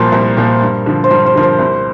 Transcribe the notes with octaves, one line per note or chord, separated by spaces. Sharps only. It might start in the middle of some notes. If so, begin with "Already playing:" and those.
Already playing: C2 A#2 F3 A#3 C5
C2 A#4
A#2 F3 A#3
G2
D3 F3
C5
G2 A#4
C5
D3 F3 A#4
C5
C2